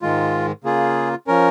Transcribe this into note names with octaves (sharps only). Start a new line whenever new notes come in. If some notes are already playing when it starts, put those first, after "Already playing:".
G#2 D#3 G#3 F4
C#3 A#3 F4 G#4
F3 C#4 A#4